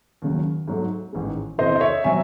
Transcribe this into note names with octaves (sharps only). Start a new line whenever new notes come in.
D#2 C#3 F#3
G#2 F#3 A3
A1 G#2 D#3 G#3
E2 C3 E3 C5 D#5
D#5
C#5 E5
C3 F#3 C4 E5 G#5